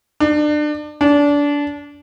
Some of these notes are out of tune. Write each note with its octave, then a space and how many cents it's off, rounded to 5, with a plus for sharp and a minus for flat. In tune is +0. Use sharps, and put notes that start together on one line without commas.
D4 +30
D4 -25